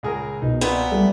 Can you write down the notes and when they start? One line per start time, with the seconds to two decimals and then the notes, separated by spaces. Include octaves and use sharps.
0.03 C#2 A#2 G#4 A#4
0.42 C2 B2 D#4
0.61 A#2 B3 C4
0.91 G3 A3